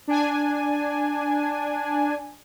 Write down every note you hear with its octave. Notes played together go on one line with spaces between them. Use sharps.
D4 G#5